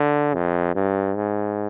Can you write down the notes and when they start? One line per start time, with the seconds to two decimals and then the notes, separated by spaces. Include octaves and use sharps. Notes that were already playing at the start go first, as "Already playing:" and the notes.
Already playing: D3
0.34 F2
0.75 G2
1.16 G#2